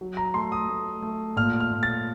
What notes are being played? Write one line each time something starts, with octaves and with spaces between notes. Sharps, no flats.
F#3
A#5
A3 C6
D#6
A3
A3
A#2 F6
F6
A#2
A6